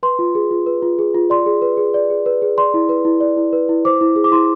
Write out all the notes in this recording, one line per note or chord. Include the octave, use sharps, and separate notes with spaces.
B4 C6
F4
G#4
F4
B4
F4
G#4
F4
D5 C6
G#4
B4
G#4
D5
G#4
B4
G#4
D5 C6
E4
B4
E4
D5
E4
B4
E4
C5 D6
E4
G#4
D6
E4 C6